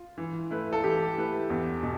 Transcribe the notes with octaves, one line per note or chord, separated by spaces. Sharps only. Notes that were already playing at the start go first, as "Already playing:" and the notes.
Already playing: F4
E3
A3 E4 B4
A4
E3 G4
A3 E4 B4
E2
B2